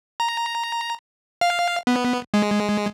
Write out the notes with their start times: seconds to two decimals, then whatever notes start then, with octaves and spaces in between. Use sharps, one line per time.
0.20 A#5
1.41 F5
1.87 B3
2.34 G#3